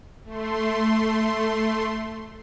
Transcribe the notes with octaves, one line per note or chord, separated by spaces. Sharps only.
A3 C6